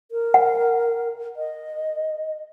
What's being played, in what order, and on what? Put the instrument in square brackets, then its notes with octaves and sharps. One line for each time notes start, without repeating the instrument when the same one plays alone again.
[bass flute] A#4
[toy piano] F#5
[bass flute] D#5